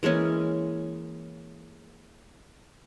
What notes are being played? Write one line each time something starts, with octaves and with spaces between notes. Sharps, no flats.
E3 G#3 A#3 C#4